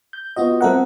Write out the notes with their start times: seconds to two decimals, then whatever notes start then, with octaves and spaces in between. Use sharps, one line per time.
0.13 G6
0.36 B3 F4 F#4 D#5
0.61 G3 C4 A4 A#4 E5 F#5